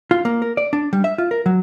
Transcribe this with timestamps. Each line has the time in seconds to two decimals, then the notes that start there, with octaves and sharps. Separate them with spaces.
0.11 F4
0.25 A#3
0.42 A#4
0.57 D5
0.73 D4
0.93 G3
1.04 E5
1.18 F4
1.31 A#4
1.46 F#3